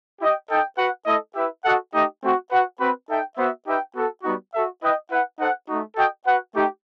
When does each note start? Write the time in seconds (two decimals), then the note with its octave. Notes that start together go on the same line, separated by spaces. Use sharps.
0.20 E4 G4 D#5 G5
0.49 D#4 A4 D#5 G5
0.77 F#4 B4 F#5
1.06 A3 E4 A4 D#5
1.35 E4 G4 B4 E5
1.64 F#4 A4 D#5 F#5
1.92 A3 D#4 G4 D#5
2.21 A3 C4 F#4
2.51 F#4 B4 F#5
2.79 C4 F#4 B4
3.08 D#4 A4 E5 G5
3.37 B3 F#4 C5 E5
3.65 D#4 G4 B4 E5 G5
3.94 B3 F#4 A4
4.23 G3 B3 D#4 F#4
4.52 F#4 A4 E5
4.80 E4 B4 D#5 G5
5.10 E4 B4 F#5
5.38 D#4 A4 C5 F#5
5.68 A3 D#4 F#4
5.95 F#4 A4 D#5 G5
6.25 F#4 B4 F#5
6.53 A3 D#4 G4